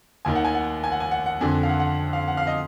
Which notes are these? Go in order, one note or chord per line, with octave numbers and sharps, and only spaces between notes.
D#2 D#3 G#5
F#5
G#5
F#5
G#5
F#5
G#5
F#5
F#5
F2 D3 G#5
F5
F#5
F#5
F5
F#5
F5
D#5